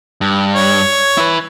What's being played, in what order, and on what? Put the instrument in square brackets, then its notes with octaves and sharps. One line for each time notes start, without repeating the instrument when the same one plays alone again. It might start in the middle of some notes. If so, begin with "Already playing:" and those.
[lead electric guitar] G2
[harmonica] C#5
[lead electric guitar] E4 B4